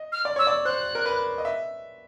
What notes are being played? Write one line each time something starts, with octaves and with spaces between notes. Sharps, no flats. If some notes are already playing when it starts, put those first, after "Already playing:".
Already playing: D#5
F6
D5
C#5 E6
D5
C5 F#6
A#4
B4
D#5
E5